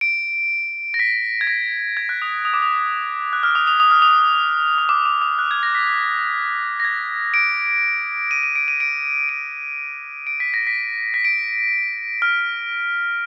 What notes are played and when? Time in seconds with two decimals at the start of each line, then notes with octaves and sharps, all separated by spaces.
0.01 D7
0.94 A#6
0.99 B6
1.41 G#6
1.47 A#6
1.97 G#6
2.09 F#6
2.22 D#6
2.45 D#6
2.54 D6
2.62 D#6
3.33 F#6
3.43 F6
3.55 D#6
3.67 D#6
3.80 D#6
3.91 F6
4.02 D#6
4.78 D#6
4.89 D6
5.06 D6
5.22 D#6
5.39 F#6
5.51 G#6
5.63 A#6
5.75 B6
5.87 B6
6.80 A#6
6.84 G#6
7.34 D7
8.31 D#7
8.43 D#7
8.55 D7
8.68 D#7
8.80 D7
9.29 D7
10.27 D7
10.40 B6
10.54 A#6
10.67 B6
11.14 B6
11.25 D7
12.22 F6